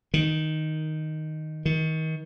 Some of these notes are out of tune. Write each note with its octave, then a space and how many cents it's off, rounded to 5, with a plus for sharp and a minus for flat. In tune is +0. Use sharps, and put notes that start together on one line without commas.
D#3 +0
D#3 +30